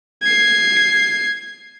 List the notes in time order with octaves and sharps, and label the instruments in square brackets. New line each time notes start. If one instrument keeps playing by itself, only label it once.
[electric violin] G#6 C7